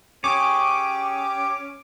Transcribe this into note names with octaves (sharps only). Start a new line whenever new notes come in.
C#4 G4 G#4 C#5 D6